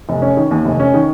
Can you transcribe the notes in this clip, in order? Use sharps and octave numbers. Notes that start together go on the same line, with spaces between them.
F1
C#4
D#3
D#2
F1
C#4
D#3